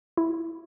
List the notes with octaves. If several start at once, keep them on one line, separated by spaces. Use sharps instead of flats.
E4